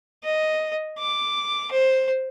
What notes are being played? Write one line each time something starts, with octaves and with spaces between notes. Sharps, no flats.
D#5
D6
C5